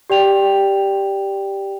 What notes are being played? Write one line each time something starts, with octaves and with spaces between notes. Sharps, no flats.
G4 D5 G5 F7